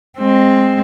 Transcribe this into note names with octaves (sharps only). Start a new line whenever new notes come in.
G#3 C4